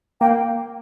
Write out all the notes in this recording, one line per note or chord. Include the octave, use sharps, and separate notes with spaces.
A#3 G5